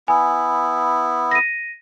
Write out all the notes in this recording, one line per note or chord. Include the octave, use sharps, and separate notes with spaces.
B3 E4 G#5
A#6 D#7